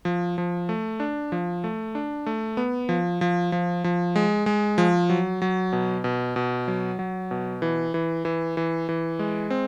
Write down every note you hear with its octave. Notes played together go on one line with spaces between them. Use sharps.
F3
F3
A3
D4
F3
A3
D4
A3
B3
F3
F3
F3
F3
G#3
G#3
F3
F#3
F#3
B2
B2
B2
F#3
F#3
B2
E3
E3
E3
E3
E3
G#3
C4